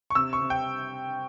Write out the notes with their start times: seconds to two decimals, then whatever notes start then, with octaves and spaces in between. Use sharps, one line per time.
0.10 C#6
0.15 C3 E6
0.33 C#6
0.41 C3
0.50 G5